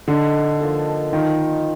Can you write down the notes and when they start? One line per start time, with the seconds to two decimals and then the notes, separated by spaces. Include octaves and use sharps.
0.08 D3 D#4 A4 C5 D#5
0.61 F3 A#3 D#4 A4
1.13 D#3 A#3 F4 A#4 D#5